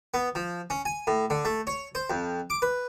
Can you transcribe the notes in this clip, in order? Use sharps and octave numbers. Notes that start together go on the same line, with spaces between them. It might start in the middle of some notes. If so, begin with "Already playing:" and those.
B3
F3
C#4
G#5
A2
D3
A3
C#5
C5
F2
D6
B4